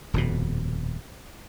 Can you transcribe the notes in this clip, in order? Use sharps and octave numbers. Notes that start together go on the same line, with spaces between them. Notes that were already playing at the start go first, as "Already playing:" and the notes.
D#1 F2 B2